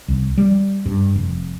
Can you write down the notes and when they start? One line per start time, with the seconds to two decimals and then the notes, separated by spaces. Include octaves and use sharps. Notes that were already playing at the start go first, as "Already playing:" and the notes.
0.08 C2
0.38 G3
0.86 G2
1.15 F1